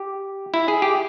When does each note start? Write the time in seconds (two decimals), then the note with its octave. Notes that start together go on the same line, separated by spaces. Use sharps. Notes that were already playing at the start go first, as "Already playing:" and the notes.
Already playing: G4
0.54 E4
0.68 G#4
0.82 G4